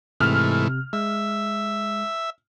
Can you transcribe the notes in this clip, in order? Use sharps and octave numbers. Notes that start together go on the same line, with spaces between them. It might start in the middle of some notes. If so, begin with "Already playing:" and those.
G#2 C3 E3 A3 F6
G#3 E5